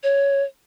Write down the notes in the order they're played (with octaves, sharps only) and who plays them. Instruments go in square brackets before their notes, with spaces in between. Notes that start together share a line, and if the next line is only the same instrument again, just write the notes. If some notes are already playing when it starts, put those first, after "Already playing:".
[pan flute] C#5